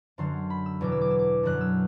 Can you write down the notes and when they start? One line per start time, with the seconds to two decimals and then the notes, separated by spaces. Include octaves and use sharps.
0.18 F#2 D3 F#3 C6
0.50 B5
0.66 E6
0.81 E2 B2 F#3 D6
0.92 E6
1.01 D6
1.10 E6
1.19 D6
1.43 F#2 D3 F#3 F#6
1.61 E6